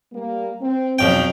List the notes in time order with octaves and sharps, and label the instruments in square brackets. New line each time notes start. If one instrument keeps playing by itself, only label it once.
[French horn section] G3 A#3
C4
[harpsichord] B1 F2 G5 [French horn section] G#3 C#4 D#4